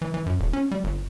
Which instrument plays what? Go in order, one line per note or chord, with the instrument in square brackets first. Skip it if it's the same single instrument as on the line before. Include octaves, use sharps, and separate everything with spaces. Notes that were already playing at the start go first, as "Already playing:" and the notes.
[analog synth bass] E3
E3
F#2
D#1
C#4
G3
G1